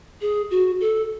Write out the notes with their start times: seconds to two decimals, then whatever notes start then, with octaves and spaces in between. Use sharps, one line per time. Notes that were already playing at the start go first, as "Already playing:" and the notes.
0.21 G#4
0.51 F#4
0.81 A4